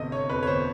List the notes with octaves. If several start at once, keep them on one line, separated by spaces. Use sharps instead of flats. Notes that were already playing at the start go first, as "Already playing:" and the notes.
Already playing: G1 C3 D#5
G1 C#5
F2 B4
C#5
G1 C5